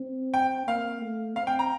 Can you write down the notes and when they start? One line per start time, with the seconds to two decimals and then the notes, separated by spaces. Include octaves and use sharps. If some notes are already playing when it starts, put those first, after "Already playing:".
Already playing: C4
0.34 G5
0.67 A#3 F5
1.01 A3
1.36 C4 F5
1.47 G5
1.59 A#5